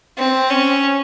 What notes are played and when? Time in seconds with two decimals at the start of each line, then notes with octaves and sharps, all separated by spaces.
0.17 C4
0.50 C#4